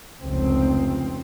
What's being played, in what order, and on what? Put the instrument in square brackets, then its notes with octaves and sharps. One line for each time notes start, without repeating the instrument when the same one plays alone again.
[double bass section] F1 C#2 C4